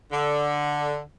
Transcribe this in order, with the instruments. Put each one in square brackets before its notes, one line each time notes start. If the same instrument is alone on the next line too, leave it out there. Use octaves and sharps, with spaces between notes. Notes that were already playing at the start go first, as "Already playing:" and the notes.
[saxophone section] D3